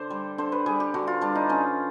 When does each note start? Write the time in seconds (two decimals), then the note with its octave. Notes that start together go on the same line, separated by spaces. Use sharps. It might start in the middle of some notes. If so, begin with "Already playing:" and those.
Already playing: D3 C5 D5
0.10 G3
0.38 D3 C5
0.52 B4
0.66 G3 G#4
0.80 G4
0.94 D3 F#4
1.07 F4
1.21 G3 D4
1.35 D#4
1.49 D3 C#4